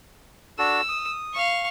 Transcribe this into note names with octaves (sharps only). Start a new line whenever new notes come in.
D4 F#4 A4 E6
D#6
F5 C#6